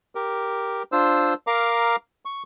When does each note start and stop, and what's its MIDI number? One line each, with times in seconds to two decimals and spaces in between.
0.15 0.83 67
0.15 0.83 70
0.92 1.34 62
0.92 1.34 65
0.92 1.34 72
0.92 1.34 88
1.47 1.96 70
1.47 1.96 77
1.47 1.96 82
1.47 1.96 86
2.25 2.43 85